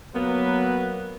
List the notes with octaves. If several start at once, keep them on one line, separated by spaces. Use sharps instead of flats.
F#3 A#3 B3 B4